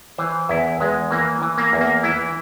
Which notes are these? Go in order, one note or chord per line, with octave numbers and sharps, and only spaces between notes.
E3 C5
E2 E4
E2 G#3
E3 A#3
E3
A#3
E2
A#3
E3 E4